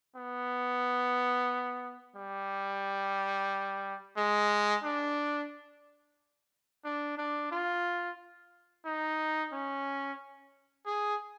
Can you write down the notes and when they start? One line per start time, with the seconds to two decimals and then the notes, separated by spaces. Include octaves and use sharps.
0.16 B3
2.16 G3
4.17 G#3
4.84 D4
6.85 D4
7.18 D4
7.52 F4
8.86 D#4
9.53 C#4
10.87 G#4